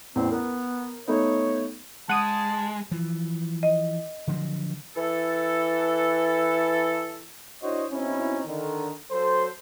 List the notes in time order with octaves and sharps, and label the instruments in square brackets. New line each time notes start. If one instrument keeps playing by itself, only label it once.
[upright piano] A1 E2 [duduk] C4
[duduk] B3 [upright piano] A#4
[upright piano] A3 B3 D#4 [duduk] C#5
[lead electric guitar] G#3 [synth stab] F#5 D#6 [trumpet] A5
[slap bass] E3 F3
[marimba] D#5
[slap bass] D3 F3 F#3
[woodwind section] E3 A4
[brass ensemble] D4 E4 F#4 C5 C#5 D#5
B2 C4 C#4 D#4 E4
D3 D#3
F#3 A4 C5